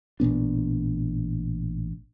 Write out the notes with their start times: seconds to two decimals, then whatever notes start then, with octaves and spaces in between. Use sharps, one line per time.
0.20 A1 A#2 B3 D4